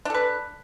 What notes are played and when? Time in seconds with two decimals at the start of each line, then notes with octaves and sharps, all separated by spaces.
0.05 D4
0.10 A4
0.14 B4